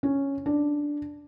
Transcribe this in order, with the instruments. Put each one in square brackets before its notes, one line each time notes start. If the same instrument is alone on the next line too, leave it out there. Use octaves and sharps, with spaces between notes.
[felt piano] C#4
D4